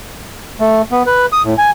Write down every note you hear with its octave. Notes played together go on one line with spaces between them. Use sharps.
A3
B3
B4
D#6
A2
G#5